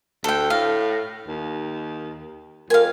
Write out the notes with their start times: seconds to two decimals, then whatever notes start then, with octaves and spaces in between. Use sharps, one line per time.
0.24 D2 A4 G5
0.50 A2 F5
1.27 D#2
2.70 F2 A#4 F5 G#5